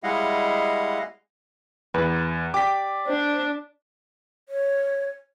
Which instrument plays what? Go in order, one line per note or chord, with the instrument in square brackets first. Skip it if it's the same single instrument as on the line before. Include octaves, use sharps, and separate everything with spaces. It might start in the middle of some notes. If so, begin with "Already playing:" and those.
[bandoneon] G3 G#3 E4 D#5 F5 F#5
[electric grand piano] E2 [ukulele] B4
[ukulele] G4 [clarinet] D5 [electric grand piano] D6 B6
[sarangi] D4 [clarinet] C5
[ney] C#5